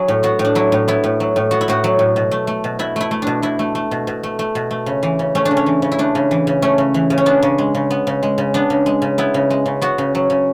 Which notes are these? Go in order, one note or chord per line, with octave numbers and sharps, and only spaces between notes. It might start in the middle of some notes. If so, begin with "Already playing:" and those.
Already playing: F#3 G#4
A2
B3 F#4
A2
D4
F#3 E4
A2
B3 E4
A2
F#3
A2
B3 F#4
E4
A2 F#4
F#3
A2
B2
A3
A3
B2
B2 E4
A3 E4
A3
B2 D4
B2 E4
A3
A3
B2
B2
A3
A3
B2
A3
C#3
E3
C#3
A3 C#4
D4
C#3
C#4
E3
C#3
E4
A3 D4
C#3
E3
C#3
A3 C#4
C#3
E3
C#3
C#4
B3 D4
C#3
G#3
C#3
B3
C#3
G#3
C#3
B3 D4
C#3
G#3
C#3
B3 E4
C#3
G#3
C#3
B3 F#4
C#3
F#3
C#3